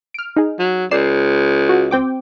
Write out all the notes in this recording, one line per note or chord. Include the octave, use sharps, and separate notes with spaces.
F6 D7
D#4 G#4
F#3
C#2 D5 C7 E7
F#4
C4 G5 D6